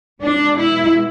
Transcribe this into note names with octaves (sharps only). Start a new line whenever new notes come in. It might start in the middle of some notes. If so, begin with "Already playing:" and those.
B2 G#3 D4
E4